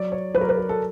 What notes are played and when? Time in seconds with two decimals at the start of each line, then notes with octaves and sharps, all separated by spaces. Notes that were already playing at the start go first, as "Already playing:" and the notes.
Already playing: F#3 D5
0.12 C#5
0.34 F#3 B4
0.41 A#4
0.49 B4
0.57 A#4
0.69 A4